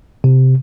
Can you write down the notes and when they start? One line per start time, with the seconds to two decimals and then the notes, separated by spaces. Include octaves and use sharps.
0.24 C3